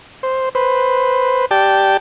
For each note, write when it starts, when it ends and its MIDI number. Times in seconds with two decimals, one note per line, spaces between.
0.23 0.49 72
0.55 1.46 71
0.55 1.46 72
1.51 1.97 67
1.51 1.97 74
1.51 1.97 79
1.51 1.97 81